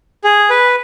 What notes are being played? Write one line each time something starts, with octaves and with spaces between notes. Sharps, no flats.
G#4
B4